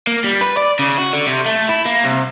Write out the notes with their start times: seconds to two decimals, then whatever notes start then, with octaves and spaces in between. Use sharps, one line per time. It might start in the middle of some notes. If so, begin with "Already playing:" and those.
0.07 A#3
0.24 G3
0.41 B4
0.57 D5
0.79 C#3
0.98 F#4
1.13 D3
1.27 C3
1.46 A3
1.69 E4
1.85 A#3
2.04 C2